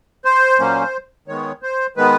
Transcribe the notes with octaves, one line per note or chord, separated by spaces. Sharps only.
C5
A#2 F#3 A#3 C#4
D#3 G#3 B3 C#5
C5
D#3 G#3 B3 B4